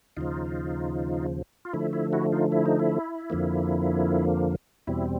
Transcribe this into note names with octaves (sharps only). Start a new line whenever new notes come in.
D#2 C#3 F3 D#4 F4
F4
D3 F3 A3 E4
E4
E4 F#4
D#4 F4
E4
D#4
E4
F2 D3 F3 A#3
E2 B2 G3 C4 E4